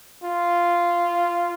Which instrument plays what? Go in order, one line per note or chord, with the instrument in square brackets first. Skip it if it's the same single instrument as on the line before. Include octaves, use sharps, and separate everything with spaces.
[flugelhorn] F4